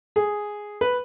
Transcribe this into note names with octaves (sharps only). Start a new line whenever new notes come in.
G#4
B4